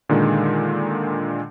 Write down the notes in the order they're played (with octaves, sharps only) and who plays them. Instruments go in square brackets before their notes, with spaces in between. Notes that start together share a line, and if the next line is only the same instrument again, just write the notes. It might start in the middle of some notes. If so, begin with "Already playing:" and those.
[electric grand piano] A#2 D3 D#3 G#3